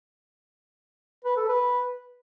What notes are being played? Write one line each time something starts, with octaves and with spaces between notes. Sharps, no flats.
B4
A4
B4